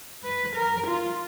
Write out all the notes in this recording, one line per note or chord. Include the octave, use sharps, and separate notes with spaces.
B4
A#4
F4